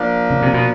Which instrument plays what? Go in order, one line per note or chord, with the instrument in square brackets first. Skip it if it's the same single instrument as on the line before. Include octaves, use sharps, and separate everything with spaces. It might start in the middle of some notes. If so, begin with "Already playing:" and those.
Already playing: [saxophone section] F3 A#3 D4
[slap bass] C#3
C3
B2